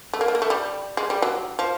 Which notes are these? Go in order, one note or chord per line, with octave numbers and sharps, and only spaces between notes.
A3
A#3
A3
A#3
A3
G3
G#3
G3
F#3
F3